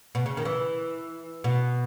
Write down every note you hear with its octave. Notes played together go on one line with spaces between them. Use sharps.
B2
C#3
D#3
E3
B2